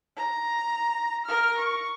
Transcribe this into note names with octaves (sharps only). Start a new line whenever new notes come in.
A#5
A#4 F6
C#6